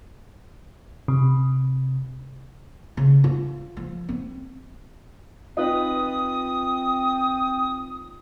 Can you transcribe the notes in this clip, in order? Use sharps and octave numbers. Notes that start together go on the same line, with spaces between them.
C3
C#3
F4
F3
C4
C4 D#4 F4 B4 D#6